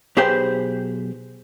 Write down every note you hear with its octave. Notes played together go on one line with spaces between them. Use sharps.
B1 G4 G#4 B4 C5 G5